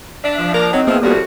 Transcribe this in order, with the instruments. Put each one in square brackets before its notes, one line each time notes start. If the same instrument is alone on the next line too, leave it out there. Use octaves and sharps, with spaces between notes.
[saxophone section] D4 [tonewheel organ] E5
[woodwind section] F3
[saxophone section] A#3 D4 A#4 [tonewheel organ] D6 A#6
[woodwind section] D#3 C4 [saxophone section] F#3 [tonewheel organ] D#4
[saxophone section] F3 E4 C5 [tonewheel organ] A#3 B3 G#4
[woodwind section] C2 A2 F#4 [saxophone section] F2 G3